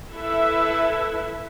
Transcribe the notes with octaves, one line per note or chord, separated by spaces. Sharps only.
E4 A4 B4 E5